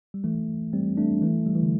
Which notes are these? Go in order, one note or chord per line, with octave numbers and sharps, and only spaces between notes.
G3
E3 A3
G3 C4
A3 D4
E3 A3
G3
E3
D3